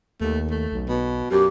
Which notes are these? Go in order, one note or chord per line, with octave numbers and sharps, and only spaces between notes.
D#2 A3
A3
B1
B2
F#2 G4